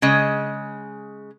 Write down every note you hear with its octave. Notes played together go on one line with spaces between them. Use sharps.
C#3 G#3 D#5